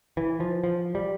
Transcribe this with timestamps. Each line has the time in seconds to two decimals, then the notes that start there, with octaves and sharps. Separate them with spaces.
0.17 E3
0.40 F3
0.64 F3
0.95 G3